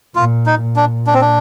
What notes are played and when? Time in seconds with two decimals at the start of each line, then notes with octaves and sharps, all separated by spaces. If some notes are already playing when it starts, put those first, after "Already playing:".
0.15 A#2 F4
0.46 D#4
0.61 A#2
0.76 D4
1.07 D4
1.14 C4
1.21 D4